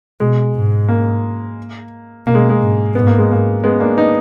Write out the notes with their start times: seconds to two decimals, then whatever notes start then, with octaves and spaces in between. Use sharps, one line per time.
0.20 B2 G#3
0.55 G#2
0.89 A#3
2.26 B2 A#3
2.34 G#3
2.49 G#3
2.61 G#2
2.95 G#2 B3
3.07 A#3
3.18 G#3
3.31 A#3
3.64 G#3 B3
3.80 A#3 D4
3.97 B3 D#4